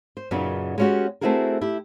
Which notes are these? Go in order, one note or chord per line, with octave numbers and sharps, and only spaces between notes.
C5
F#2 A#2 C#3 B3 D#4
G#3 B3 C#4 D#4 F#4 G4
A3 C4 E4 F#4 G#4 A#4
E4 G4